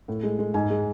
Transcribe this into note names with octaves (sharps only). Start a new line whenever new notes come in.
A2
G#3
G#3
G#2 G#5
G#3